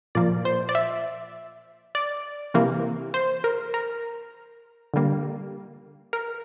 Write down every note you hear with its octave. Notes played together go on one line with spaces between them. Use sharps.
A#2 F3 A#3 D5
C5
D5
E5
D5
C3 E3 A#3
C5
A#4
A#4
D3 G3 A#3
A#4